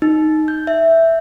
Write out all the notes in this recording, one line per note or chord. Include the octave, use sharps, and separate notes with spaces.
D#4
G6
E5